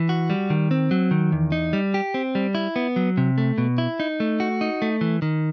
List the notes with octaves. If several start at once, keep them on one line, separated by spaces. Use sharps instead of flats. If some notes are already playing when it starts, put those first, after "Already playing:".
Already playing: E3
F#4
G3
D#3
C4
F#3
D#3
E2
D#4
G3
G4
C4
G3
E4
B3
F#3
C3
A3
B2
E4
D#4
A3
F#4
D#4
A3
E3
D#3